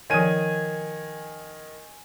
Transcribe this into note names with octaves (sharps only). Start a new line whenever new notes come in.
D#3 F3 C#5 G#5 D#7